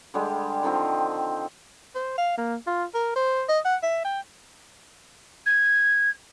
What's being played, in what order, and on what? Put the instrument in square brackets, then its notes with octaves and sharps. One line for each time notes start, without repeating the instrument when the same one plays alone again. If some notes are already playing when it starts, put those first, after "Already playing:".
[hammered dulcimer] D3 G3 G#3 G4
D3 D#3 F3 C4
[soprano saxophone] C5
F5
A#3
F4
A#4
C5
D#5
F#5
E5
G5
[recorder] G#6